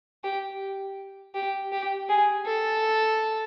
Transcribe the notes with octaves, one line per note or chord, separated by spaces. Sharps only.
G4
G4
G4
G#4
A4